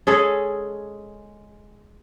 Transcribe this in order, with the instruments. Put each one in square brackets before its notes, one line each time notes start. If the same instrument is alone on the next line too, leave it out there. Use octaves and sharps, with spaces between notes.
[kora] G#3 C#4 G#4 A4